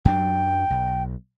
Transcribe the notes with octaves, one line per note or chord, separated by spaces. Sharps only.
F#2 F#3 D4 G5
B1